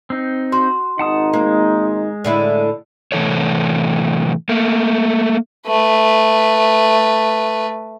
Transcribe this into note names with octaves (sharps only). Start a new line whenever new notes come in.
C4 D#4
F#4 C6
G#1 D#4 F#5 A5 D#6
G#3 A#3
A2 D3 E4
A2 C3 E3 A4 C#5
A3 A#3
A3 B4